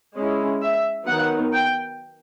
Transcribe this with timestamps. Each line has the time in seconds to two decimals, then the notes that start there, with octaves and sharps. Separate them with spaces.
0.14 G#3 C#4 E4
0.61 E5
1.07 D#3 F#3 B3 D#4 F#5
1.53 G5